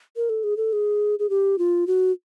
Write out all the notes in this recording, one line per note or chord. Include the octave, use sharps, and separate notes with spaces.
A#4
A4
G#4
A4
G#4
G#4
G4
F4
F#4